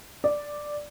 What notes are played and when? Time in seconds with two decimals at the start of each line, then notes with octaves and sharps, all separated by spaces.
0.24 D5